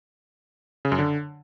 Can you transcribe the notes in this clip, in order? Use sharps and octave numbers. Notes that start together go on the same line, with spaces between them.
C#3
F#2
D3